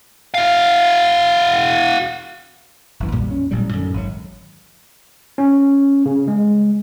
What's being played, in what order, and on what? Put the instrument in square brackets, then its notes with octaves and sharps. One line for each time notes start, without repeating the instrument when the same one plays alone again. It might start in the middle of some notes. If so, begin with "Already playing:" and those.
[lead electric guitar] F#4 F5
[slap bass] F#1 E3
A#1 F2 A#2 G3
C#4
A1 A#2 F#3 G3
F#2 A2 D3 D#3
G#1 F#3
[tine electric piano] C#4
C#3
G#3